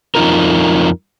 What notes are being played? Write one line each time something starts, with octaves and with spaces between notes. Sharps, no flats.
F2 B2 D#4 F4 A#4